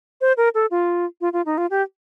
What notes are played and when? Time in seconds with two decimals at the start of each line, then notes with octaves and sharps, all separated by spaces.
0.21 C5
0.37 A#4
0.54 A4
0.71 F4
1.21 F4
1.33 F4
1.46 D#4
1.58 F4
1.71 G4